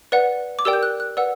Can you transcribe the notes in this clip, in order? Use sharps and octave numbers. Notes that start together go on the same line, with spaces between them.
B4 D5 F#5
D6
G4 A#4 D5 G5 E6
G6
F#6
F#6
B4 D5 F#5 E6